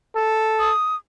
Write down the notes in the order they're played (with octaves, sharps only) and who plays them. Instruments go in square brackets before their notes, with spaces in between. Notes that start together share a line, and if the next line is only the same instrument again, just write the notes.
[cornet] A4
[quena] D#6